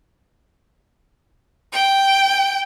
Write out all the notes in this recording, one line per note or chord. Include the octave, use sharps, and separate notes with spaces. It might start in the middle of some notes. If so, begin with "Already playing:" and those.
G5